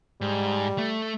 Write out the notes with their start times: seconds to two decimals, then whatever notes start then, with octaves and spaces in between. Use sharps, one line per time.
0.21 G#2 G3
0.78 A3